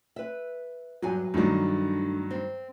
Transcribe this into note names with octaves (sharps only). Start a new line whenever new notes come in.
B4 E5
E2 G2 F#3 G#5
G2 D#3 F#3 A3 D4
C4